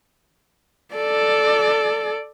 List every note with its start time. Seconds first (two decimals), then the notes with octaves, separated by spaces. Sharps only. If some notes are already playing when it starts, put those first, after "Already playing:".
0.95 A4 D5